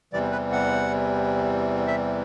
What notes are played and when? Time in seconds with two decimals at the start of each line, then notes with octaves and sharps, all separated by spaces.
0.13 E2 C3 E3 G3 D5
0.32 B4
0.52 F#5
1.87 E5